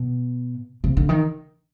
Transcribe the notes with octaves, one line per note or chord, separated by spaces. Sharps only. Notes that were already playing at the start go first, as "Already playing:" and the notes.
Already playing: B2
C3
D3
D#3